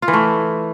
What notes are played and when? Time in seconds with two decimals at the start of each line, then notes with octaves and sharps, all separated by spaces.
0.02 F4
0.08 E3
0.13 A3